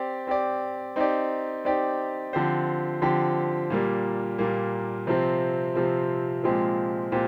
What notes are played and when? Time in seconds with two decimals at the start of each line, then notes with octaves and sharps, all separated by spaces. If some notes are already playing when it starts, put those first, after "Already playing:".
Already playing: C4 G4 D5
0.27 C4 G4 D5
0.96 C4 D#4 G4 D5
1.65 C4 D#4 G4 D5
2.33 D3 F3 C4 G4 C5
3.02 D3 F3 C4 G4 C5
3.70 A#2 G3 A#3
4.38 A#2 G3 A#3
5.07 C3 F3 C4
5.75 C3 F3 C4
6.44 A#2 F3 G#3 C4 G4
7.12 A#2 C4 G4